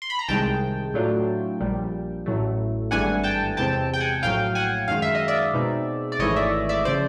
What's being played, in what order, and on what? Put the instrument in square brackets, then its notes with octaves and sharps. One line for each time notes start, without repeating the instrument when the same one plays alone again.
[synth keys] C6
B5
A#5
C2 C3 D#3 G#3 G5 A5
A2 F#3 A3 D4 F4
A#1 A#2 G3
A1 A2 F#3 A3
G#1 G2 E3 A3 D4 F#5 G#5
G5 A5
E2 C3 E3 G#3 C4 G5 A5
G5
F#5 G#5
A#1 A2 F#3 F5 G5
F#5 G#5
F#2 D#3 G#3 F5
E5
D#5
D5 E5
B2 G#3 C4 D#4
D5
G#1 G#2 E3 A3 C#5 D#5
D5 E5
D5 E5
C#3 F3 C5 D5